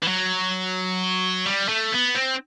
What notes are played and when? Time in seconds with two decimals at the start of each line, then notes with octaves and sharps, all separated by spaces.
0.02 E3
0.08 F#3
1.46 G3
1.69 A3
1.92 B3
2.15 C4